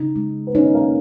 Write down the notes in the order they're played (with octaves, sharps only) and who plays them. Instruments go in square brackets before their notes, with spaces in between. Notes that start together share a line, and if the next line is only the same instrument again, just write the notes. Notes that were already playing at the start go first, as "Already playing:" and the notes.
Already playing: [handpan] C#3 [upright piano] D#4
[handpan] G#3
[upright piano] B3
[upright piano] C#4 [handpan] D#4
[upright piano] A#3